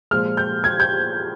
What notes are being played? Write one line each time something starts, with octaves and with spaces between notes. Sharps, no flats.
A#2 F3 G#3 F6
G6
G#6
G6